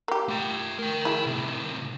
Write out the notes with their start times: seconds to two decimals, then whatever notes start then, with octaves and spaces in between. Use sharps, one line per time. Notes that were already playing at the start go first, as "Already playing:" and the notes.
0.08 A#3 G4
0.29 A3 G5
0.79 A#4 G5
1.05 E4 G#4
1.26 A2 C3